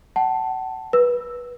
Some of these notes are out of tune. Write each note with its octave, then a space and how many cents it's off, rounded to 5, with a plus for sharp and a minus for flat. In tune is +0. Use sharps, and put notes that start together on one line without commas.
F#5 +35 A5 +0
B4 -20 E6 +0